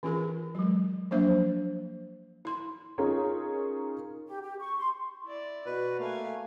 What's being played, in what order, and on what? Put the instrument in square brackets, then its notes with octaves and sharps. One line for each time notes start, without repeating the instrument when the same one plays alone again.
[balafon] E3 C#4 F4 G#4 A#4
F#3 G#3
F3 F#3 A#3 D4 C5 E5
E4 C6
[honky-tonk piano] C#4 D#4 F4 G#4 A#4 C#5
[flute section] G4
G4
C#6
C6
[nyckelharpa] E4 D5
[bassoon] B2 [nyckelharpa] F#4 [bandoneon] B4
[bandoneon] A3 [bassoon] A#3 [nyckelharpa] F5 G#5